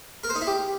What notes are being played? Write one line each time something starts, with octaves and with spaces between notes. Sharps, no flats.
A#4
C5
D#4
E4
G4